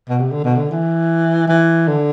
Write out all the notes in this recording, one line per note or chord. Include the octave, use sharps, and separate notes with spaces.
B2
C3
D3
B2
D3
E3
E3
D3